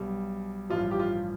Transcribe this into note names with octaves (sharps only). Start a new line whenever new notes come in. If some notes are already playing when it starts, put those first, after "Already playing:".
Already playing: B1 B2 G3
A1 G2 F3 F4
G4
F4